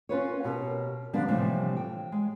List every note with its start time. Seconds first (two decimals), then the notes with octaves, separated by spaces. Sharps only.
0.09 C#4 F4 B4 C#5
0.44 B2 G4 A#4
1.13 D3 F3 G3 A#3 B3 D4
1.28 A2 C3 E3 F3 G3 A3
1.77 G5
2.12 G#3